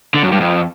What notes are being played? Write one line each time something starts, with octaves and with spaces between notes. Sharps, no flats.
D3
F#2
G2
F2